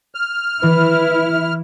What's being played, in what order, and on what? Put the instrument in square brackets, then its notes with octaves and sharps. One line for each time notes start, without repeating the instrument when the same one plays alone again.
[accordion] F6
[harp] E3 [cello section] E4 [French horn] B4